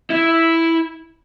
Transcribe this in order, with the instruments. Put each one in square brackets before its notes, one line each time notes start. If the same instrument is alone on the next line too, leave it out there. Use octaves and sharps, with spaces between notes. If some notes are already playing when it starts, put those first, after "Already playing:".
[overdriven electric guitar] E4